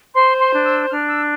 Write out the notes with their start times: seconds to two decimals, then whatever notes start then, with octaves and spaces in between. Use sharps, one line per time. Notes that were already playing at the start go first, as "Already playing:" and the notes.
0.14 C5 C6
0.39 C6
0.52 D4
0.64 E6
0.89 D4 F6
1.08 E6